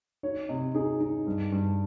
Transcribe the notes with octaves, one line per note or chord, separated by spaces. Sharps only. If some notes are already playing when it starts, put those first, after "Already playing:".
D#4 C#5
C3 D#5
D#4 G#4
D#4
G2
G2